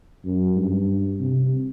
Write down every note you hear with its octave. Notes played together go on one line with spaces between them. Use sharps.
F#2
G2
C3